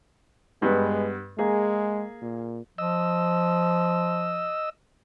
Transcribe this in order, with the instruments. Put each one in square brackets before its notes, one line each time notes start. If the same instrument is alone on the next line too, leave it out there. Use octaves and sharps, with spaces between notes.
[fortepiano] G2 B3 [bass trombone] G#3
[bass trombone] G#3 [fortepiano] A#3 G#4
[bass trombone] A#2
[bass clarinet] F3 [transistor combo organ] D#5 E6